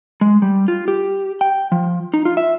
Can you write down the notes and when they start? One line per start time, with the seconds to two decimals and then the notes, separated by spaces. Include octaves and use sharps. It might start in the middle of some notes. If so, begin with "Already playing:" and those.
0.21 G#3
0.42 G3
0.68 F4
0.88 G4
1.41 G5
1.72 F3
2.14 D#4
2.25 F4
2.37 E5